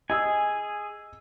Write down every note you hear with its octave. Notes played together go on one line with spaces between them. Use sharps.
G#4 D#5 G#5 E6